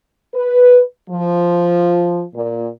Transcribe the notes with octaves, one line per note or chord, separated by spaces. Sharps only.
B4
F3
A#2